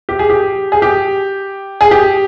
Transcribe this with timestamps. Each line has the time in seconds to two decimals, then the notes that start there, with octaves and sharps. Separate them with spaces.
0.09 G4
0.19 G#4
0.30 G4
0.72 G#4
0.82 G4
1.81 G#4
1.91 G4